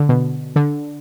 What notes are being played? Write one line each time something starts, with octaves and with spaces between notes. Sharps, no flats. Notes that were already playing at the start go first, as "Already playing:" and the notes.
Already playing: D3
B2
D3